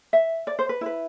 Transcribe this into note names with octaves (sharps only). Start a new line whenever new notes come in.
E5
D5
C5
B4
E4 B4